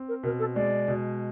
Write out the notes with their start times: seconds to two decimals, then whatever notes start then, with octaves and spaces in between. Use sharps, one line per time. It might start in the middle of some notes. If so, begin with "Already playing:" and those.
Already playing: C4
0.08 A#4
0.23 B2 A#4
0.39 A4
0.55 G#3 D5
0.88 B2